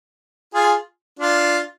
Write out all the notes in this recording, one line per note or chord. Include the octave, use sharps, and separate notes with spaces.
F4 G#4
D4 F4